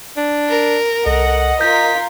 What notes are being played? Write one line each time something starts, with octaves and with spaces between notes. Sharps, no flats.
D4
A#4
C2 A4 D#5 F#5
F4 A#4 G6 B6